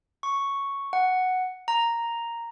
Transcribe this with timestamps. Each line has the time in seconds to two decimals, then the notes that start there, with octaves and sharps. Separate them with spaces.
0.23 C#6
0.93 F#5
1.68 A#5